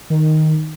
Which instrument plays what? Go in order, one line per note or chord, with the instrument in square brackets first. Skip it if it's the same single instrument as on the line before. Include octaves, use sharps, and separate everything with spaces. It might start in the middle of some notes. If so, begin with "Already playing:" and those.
[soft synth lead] D#3